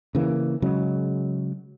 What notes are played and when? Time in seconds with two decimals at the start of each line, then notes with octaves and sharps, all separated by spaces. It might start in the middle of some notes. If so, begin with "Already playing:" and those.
0.15 C#3 E3 A#3
0.62 C#3 F#3 G#3